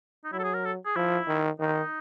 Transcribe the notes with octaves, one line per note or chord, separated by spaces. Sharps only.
D#4
F#3 E4
A4
G#4
A#4
A4
G#4
F3 E4
D#3
D#3 D#4